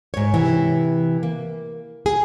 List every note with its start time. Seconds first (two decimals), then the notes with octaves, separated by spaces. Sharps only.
0.14 G#2 C#5
0.34 C3 E3
1.23 A#3
2.06 G#4